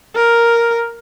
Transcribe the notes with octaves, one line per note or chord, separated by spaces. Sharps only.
A#4